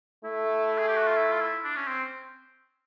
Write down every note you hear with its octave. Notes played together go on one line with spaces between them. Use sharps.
A3 E4
G#4
G4
F#4
F4
E4
F4
E4
D4
C#4
C4